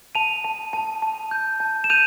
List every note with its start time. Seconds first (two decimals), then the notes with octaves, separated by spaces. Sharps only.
0.15 A5 D#7 F7
0.44 A5
0.73 A5
1.02 A5
1.31 G6
1.60 A5
1.84 E7
1.90 G6 D#7 F7